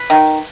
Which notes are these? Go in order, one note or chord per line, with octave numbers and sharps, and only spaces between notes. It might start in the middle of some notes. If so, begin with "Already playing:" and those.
Already playing: B4
D#3